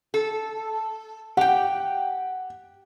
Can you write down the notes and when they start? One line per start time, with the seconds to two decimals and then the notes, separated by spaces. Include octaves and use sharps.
0.14 A4
1.37 G4 F#5 G5